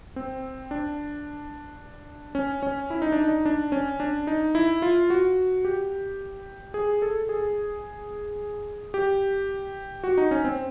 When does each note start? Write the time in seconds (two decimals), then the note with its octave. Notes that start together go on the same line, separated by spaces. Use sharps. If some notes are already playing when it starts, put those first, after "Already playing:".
0.16 C4
0.71 D4
2.35 C#4
2.63 C#4
2.90 E4
3.02 D#4
3.12 D4
3.24 D#4
3.46 D4
3.72 C#4
4.00 D4
4.27 D#4
4.55 E4
4.82 F4
5.10 F#4
5.65 G4
6.74 G#4
7.02 A4
7.29 G#4
8.94 G4
10.04 F#4
10.18 D#4
10.31 C#4
10.44 C4